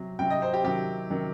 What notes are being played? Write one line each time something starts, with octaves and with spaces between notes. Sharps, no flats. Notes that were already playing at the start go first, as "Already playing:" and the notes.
Already playing: C3 F#3
C3 F#3 G5
D#5
C5
G4
C3 D#3 F#3 G4
C3 D#3 F#3